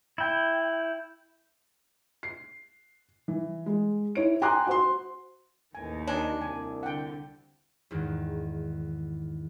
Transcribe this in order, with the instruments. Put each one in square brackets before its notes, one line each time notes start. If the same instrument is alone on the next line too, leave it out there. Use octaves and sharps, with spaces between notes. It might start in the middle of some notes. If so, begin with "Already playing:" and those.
[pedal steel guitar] E4 G5
[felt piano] C7
E3
G#3
E4 C#5 D7
G5 G#5 A#5 C6 D6 F#6
F#4 C5 C6
[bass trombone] A1 [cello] D#2 D#3 [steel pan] G#5
[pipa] D4 [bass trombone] D#4 [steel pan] C#5 G#5
[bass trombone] C2 [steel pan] G#5
[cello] D3 [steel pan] F#5 G5
[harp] E2 G#2 D#3